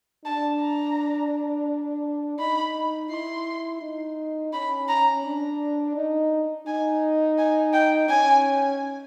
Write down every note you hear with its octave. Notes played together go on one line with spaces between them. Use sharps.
D4 A5
A#5
D#4 B5
E4 C6
D#4
C#4 B5
A#5
D4
D#4
D#4 G#5
G#5
G5
C#4 G#5